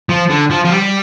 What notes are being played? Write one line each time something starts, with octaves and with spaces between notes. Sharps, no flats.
F3
D3
F3
F3
G3